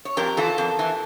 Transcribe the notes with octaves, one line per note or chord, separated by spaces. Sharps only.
C#5
F2 G4 A#4
E3 F4 A4
F2
E3